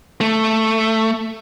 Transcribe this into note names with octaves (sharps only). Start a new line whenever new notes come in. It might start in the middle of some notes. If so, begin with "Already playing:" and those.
A3